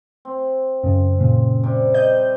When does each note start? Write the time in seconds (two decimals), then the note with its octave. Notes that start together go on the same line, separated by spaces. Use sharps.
0.25 C4
0.83 F#2 C#3
1.19 A#2 C#3
1.63 C3 G3
1.94 D#5 G6